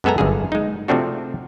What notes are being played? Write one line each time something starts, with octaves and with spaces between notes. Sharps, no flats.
F#2 G#3 B3 A4 G#5 A#5
G1 F#2 D3 A#3 G#4
G#3 D#4
C3 F3 A3 C4 D4 F#4